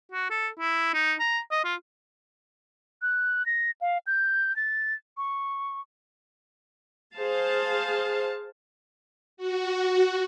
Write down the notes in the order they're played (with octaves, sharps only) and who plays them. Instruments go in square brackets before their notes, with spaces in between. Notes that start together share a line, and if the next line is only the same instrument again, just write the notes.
[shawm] F#4
A4
E4
D#4
A#5
D#5
F4
[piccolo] F#6
A#6
F5
G6
A6
C#6
[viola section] G#4 C5 F5 A5
[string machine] F#4